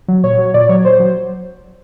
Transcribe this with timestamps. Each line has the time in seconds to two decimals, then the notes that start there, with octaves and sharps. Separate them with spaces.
0.08 F#3
0.24 A#2 C#5
0.38 F#3
0.54 A#2 D5
0.69 F#3 C#5
0.85 A#2 C5
1.00 F#3